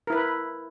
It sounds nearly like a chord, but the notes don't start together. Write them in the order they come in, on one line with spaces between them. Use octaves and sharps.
A#4 E4 B4